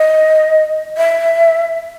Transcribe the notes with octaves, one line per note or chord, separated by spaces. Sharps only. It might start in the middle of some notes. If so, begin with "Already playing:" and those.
Already playing: D#5
E5